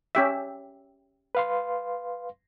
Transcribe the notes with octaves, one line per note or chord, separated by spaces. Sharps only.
C#4 G4 E5
B4 F5 C6